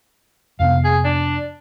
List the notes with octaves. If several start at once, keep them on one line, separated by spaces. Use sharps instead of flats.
F2 C3 B3 F5
G#4
D4